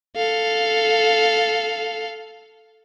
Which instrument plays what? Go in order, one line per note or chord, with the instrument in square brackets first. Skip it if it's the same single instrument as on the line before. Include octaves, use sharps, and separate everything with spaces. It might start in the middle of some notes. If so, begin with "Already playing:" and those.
[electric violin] A4 F5